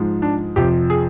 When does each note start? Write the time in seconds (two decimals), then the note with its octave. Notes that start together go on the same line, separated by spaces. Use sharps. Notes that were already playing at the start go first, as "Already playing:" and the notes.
Already playing: G#2 F3 G#3
0.22 D4
0.56 F2 C3 F3 G4
0.90 G#4